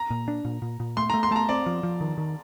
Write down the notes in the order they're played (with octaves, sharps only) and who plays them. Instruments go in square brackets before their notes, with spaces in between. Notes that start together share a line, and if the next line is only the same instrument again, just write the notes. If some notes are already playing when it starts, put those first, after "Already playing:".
Already playing: [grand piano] A#5
[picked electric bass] A#2
D4
A#2
A#2
A#2
[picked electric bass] A3 [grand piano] C6
[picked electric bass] A3 [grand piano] A#5
[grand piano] C6
[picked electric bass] A3 [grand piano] A5
[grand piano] A#5
[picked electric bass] C4 [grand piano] D5
[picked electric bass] F3
F3
D#3
D#3